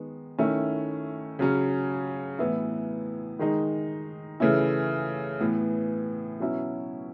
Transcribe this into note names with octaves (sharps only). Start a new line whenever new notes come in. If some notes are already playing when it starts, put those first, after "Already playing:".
Already playing: D#3 G#3 B3
D#3 A3 C#4 E4
C#3 F#3 C#4
A2 E3 B3 E4
D#3 G#3 D#4
C#3 E3 A3 C#4 E4
A2 E3 B3
B2 F#3 C#4 E4